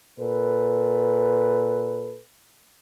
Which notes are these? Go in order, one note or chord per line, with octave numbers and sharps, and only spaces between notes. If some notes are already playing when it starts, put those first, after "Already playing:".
A#2 A4 B4